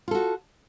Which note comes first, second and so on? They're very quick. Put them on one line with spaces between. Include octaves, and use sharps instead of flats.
F4 A4 F#4